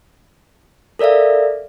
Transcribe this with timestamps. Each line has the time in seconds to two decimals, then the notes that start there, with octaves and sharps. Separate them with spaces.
0.99 A4 A#4 D5 E5 F5